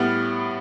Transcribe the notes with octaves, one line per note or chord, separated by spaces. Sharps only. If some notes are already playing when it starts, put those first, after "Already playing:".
Already playing: A2 G3 B3 F6 A6